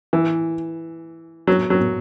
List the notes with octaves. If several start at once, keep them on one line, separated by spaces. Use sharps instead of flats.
E3
F#3
F#3